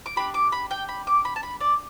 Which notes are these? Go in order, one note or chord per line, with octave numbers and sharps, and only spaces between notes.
D6
D4 G4 B5
D6
B5
G5
B5
D6
B5
A5
B5
D5